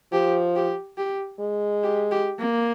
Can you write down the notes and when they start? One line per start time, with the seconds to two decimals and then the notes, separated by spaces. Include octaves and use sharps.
0.12 F3 G4
0.55 G4
0.98 G4
1.40 G#3
1.84 G4
2.11 G4
2.39 A#3